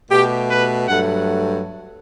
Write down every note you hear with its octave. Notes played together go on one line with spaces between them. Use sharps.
B2 A3 G4
B4
G2 F#3 A3 F#5